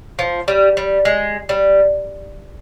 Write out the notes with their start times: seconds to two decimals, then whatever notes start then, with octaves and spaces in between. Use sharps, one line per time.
0.19 F3
0.48 G3
0.77 G3
1.05 G#3
1.49 G3